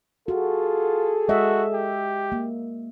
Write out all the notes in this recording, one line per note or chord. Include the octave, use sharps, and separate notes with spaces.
F4 F#4 G#4 A4
G#3 F#4 D#5 E5
G4
A#3